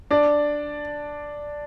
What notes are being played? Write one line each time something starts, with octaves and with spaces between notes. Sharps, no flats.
D4 D5